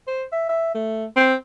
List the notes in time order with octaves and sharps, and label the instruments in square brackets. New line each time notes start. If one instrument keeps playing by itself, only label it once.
[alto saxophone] C5
E5
E5
A3
C4